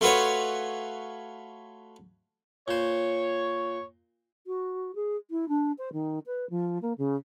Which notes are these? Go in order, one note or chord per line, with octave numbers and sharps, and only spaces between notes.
A3 F4 F#4 B4 C#5
A#2 C5 C#5
F#4
G#4
E4
D4
C5
D#3
B4
F3
A#3
C#3